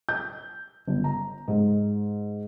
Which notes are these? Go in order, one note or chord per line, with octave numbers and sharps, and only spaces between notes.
G6
G1
A#5
G#2